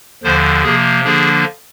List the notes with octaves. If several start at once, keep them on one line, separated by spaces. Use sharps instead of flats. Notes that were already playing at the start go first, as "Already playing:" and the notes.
D#2 D3 F3 C5
C3 F3 A#3 G#4
D3 F3 A#3 D4 G#4